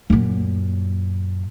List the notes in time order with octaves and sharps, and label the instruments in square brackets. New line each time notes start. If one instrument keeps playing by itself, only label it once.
[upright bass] F#2 A#2